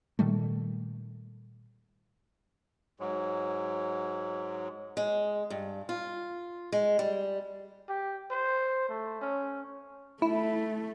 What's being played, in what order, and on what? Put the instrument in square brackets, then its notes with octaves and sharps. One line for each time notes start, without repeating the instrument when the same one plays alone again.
[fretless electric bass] A#2 D#3 G3 A3
[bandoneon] G#2 F#3
[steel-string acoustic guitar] G#3
G2
F4
G#3
G3
[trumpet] G4
C5
A3
C#4
[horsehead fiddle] A3 [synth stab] E4